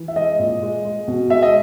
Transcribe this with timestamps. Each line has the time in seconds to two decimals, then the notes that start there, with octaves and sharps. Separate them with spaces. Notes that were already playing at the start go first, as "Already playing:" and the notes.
Already playing: E3
0.08 E5
0.16 G#3 D#5
0.39 A#2
0.63 G#3
0.85 G#3
1.08 B2
1.30 G#3 E5
1.43 D#5